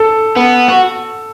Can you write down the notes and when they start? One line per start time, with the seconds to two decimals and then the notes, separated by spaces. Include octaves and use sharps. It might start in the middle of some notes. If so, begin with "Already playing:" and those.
Already playing: A4
0.37 B3
0.69 F#4